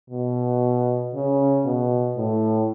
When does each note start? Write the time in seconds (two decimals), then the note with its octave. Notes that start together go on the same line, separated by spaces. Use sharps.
0.10 B2
1.14 C#3
1.65 B2
2.17 A2